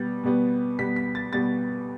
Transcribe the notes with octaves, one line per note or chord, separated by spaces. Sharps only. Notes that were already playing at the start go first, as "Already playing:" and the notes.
Already playing: B2 G3 B3 A6
B2 G3 B3
B2 G3 B3 B6
B6
A6
B2 G3 B3 A6